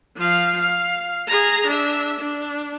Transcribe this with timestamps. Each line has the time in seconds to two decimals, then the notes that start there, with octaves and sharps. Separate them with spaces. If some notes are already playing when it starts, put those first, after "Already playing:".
0.16 F3 F5
0.61 F5
1.27 G#4 A#5
1.66 D4 E5
2.20 D4